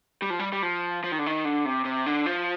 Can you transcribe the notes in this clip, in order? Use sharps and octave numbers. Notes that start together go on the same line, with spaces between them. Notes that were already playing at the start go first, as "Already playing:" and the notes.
G3
F3
G3
G3
F3
F3
D#3
D3
D#3
D3
C3
C3
D3
F3